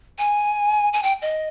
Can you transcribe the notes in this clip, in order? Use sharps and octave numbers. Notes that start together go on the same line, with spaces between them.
G#5
G#5
G5
D#5